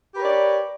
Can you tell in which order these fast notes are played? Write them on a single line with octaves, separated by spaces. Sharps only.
G4 B4 A#4 C#5 D5